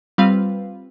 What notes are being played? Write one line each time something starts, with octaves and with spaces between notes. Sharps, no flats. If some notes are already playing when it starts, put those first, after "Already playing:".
G3 C4 F4 B4 F5